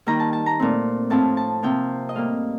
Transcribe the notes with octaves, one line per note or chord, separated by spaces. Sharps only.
D#3 G3 A#3 A#5
A5
A5
A#5
A#2 A3 C4
A2 F3 C4 A5
A5
C3 F3 A#3 G5
D#5
A2 G3 A#3 F5